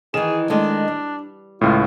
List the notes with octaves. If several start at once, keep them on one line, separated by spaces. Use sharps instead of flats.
D#3 E3 G#4 E7
D#3 G#3 A3 D4
G3
C#2 A2 F4